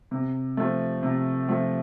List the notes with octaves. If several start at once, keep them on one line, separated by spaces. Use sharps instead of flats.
C3
F3 A3
C3
F3 A3